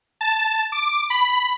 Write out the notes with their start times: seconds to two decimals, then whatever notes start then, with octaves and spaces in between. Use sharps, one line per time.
0.21 A5
0.72 D6
1.10 B5